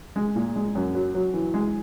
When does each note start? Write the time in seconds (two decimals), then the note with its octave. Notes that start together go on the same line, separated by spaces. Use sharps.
0.16 G#3
0.36 A#2
0.56 G#3
0.75 F#2
0.95 F#3
1.15 F#3
1.34 E3
1.54 G#3